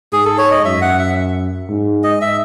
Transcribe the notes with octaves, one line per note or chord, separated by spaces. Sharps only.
G#2 G#4
A4
C#5
D#5
F#2 E5
F#5
E5
G#2
D#5
E5